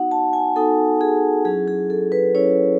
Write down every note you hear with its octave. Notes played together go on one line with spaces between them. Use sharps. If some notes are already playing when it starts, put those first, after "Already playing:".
Already playing: B3 D#4 F#4 F#5
A5
G#5
B3 D#4 F#4 A4
G#4
F#3 C#4 E4 G#4
G#4
A4
B4
F#3 C#4 E4 C#5